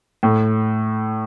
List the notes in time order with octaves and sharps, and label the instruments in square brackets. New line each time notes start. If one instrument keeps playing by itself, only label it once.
[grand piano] A2